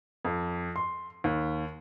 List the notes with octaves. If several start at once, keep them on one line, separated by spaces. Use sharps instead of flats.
F2
C6
D#2